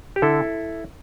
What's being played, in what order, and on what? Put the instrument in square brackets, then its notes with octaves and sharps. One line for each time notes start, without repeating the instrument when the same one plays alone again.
[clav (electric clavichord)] G4
D3 E4 A4